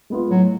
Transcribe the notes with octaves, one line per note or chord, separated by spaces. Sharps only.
G#3 B3 F4
A2 F#3